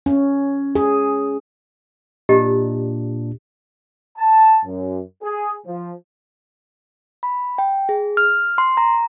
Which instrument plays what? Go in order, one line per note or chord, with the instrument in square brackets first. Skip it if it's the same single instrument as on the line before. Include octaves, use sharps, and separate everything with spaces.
[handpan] C#4
G#4
[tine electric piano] A#2 D4 [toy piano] G4 D#5
[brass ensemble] A5
F#2
G#4
F3
[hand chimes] B5
G5
G#4
F6
C6
A#5